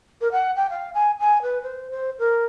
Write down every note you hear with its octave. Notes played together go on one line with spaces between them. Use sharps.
A#4
F#5
G5
F5
G#5
G#5
B4
C5
C5
A#4